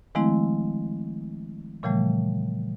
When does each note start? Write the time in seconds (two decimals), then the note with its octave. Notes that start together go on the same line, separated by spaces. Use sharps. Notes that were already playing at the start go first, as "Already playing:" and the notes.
0.15 D#3 F3 G#3 A3 C4 E4
1.83 A#2 C#3 E3 F3 G3 A3